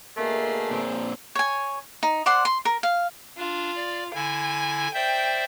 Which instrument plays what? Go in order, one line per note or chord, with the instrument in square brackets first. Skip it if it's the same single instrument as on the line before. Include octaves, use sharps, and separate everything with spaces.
[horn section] B2 D3 A3 [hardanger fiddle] A#3 G#4
[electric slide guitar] A#2 C4
[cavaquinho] C#5 G#5
D#4
C5 D5 F#5 C6
C6
A#4
F5
[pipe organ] D4 [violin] F4
[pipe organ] D5
[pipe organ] D3 E4 [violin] G#5
[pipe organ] C5 D5 E5 [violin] G5